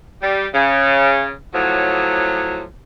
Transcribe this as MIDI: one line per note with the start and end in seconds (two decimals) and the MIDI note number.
0.23 0.47 55
0.55 1.32 49
1.54 2.65 45
1.54 2.65 53
1.54 2.65 54